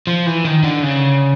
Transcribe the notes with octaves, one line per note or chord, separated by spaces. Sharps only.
F3
E3
D#3
D3
C#3